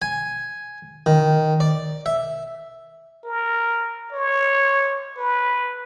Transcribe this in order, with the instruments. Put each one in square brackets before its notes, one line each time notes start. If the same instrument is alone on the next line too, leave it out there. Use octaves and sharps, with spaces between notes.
[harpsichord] G#5
D#3
D5
E5
[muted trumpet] A#4
C#5
B4